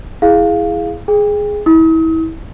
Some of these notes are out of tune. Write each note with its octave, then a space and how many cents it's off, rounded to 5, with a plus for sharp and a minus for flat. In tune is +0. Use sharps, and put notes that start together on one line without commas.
E4 +0 G#4 +0 F5 +0
G#4 +5 G5 +35
E4 -30 D#6 +40